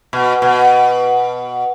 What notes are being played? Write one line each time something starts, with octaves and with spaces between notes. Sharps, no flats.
B2
B2